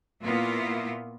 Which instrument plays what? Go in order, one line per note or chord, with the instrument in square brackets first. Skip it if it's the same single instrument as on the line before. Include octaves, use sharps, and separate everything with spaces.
[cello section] A#2 A#3 B3 E4 F4